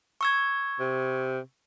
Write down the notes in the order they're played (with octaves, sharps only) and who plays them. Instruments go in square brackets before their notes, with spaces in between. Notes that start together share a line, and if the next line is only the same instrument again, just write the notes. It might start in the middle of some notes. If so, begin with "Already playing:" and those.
[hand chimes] C#6 E6 G#6
[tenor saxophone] C3